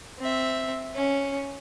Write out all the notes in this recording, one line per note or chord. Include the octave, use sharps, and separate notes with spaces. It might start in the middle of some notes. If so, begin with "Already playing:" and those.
C4 E5
C#4